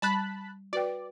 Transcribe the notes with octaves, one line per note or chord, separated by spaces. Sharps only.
G3 A5 B5 F#6
F#4 B4 D5 G5